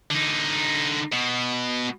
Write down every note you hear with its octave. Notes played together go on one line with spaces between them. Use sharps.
D3 D#4
B2